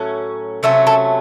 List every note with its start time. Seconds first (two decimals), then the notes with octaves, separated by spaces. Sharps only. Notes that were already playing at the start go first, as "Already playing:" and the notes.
Already playing: A2 F#3 C#4
0.63 C3 F#3 A3 C#4 A4
0.87 A4